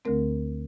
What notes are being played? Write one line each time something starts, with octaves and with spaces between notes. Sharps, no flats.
D2 D3 A3 C4 A#4